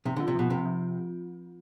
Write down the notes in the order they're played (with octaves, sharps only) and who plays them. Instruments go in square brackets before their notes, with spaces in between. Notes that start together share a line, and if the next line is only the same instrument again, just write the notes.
[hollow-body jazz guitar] C3 [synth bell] F3
[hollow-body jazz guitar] D3 [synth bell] F4
[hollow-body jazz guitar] C3
[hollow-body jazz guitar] B2 [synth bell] F3
[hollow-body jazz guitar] C3 [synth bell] C4
[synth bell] F3